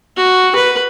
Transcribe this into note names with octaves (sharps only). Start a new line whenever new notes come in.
F#4
B4